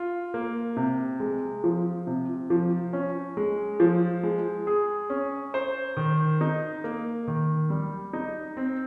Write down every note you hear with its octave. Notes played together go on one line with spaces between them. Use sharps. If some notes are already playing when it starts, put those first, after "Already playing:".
Already playing: F4
A#3
C3
G#3
F3
C3
F3
C#4
G#3
F3
G#3
G#4
C#4
C5
D#3
D#4
A#3
D#3
G3
D#4
C4